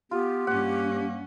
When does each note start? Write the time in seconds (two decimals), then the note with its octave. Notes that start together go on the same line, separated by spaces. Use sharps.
0.11 B3 F4 G4
0.47 G2 A#3 C#4 F#5